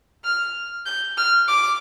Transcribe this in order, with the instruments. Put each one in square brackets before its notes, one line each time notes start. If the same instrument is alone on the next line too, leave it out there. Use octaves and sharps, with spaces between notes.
[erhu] F6
G6
F6
D6